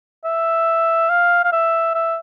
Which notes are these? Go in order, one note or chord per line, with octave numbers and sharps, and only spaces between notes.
E5
F5
F5
E5
E5